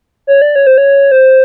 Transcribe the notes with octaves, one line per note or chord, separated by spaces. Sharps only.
C#5
D5
C#5
C5
C#5
C5